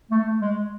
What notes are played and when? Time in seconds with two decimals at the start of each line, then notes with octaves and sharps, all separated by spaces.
0.11 A3
0.41 G#3